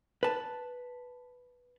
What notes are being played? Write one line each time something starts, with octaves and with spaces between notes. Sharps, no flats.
B4 A5